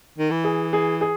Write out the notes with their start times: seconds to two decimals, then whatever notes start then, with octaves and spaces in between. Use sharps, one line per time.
0.19 D#3
0.31 E3
0.44 G#4
0.73 G#4
1.01 G#4